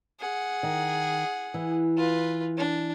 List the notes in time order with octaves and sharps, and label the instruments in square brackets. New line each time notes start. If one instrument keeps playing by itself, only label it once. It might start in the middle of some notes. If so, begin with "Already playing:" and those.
[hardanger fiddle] G#4 F#5
[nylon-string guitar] D#3
E3
[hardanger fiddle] F4 B4
D4